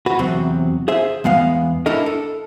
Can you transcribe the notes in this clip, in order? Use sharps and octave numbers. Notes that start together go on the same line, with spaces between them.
F#4 B4
E2 C3 F#3 C4
G#4 C5 E5
E2 G#3 B3 F5
D4 E4 A4 A#4 D#5
A4